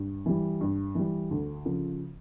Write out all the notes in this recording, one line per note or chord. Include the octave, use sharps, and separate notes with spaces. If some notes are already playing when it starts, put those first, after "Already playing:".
Already playing: G2
E3 G3
G2
E3 G3
D2
C#3 F3